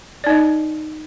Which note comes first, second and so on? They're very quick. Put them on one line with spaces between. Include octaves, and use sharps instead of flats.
D5 D#4 D#5